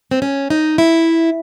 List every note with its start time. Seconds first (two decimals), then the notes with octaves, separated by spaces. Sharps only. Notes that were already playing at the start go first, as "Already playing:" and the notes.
0.11 C4
0.22 C#4
0.50 D#4
0.78 E4